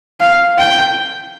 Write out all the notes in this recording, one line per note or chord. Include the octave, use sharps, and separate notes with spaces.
F5
G5